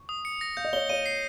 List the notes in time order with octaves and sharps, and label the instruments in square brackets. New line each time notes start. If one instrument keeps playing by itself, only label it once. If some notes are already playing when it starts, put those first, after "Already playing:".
Already playing: [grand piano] C#6
[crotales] D#6
C#7
A#6
[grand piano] F5 [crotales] G6
[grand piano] D#5
[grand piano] C#5 F5 [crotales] G7
[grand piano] C#5 F5 [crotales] D#7
[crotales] C7